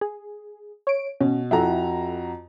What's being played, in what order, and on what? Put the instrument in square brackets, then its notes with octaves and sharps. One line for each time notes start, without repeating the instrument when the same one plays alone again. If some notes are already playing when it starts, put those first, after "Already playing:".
[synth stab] G#4
C#5 D7
[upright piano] B2 [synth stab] C#4
[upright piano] F2 F#4 A#5 [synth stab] E4 A4 E5